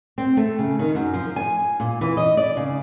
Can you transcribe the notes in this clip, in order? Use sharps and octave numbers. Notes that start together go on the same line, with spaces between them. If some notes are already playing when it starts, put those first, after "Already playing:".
C4
A3
C#3
D#3
F#2
F3
G#5
A#2
E3
D#5
D5
C#3